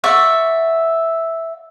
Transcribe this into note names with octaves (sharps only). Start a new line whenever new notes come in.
D5 E5 F#5 C#6